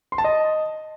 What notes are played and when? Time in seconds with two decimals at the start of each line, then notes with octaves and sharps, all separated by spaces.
0.12 C6
0.18 A5
0.24 D#5